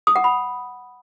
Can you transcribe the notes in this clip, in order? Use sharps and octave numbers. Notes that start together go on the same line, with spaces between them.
D#6
F#5
B5